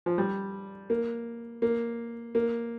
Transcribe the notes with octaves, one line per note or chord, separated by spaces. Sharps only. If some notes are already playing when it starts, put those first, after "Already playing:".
F3
G3
A#3
A#3
A#3